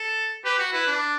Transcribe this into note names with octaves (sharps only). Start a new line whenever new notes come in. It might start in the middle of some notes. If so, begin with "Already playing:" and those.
Already playing: A4
G4 B4
F#4
E4 B4
D4